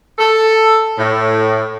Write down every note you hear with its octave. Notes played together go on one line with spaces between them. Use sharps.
A4
A2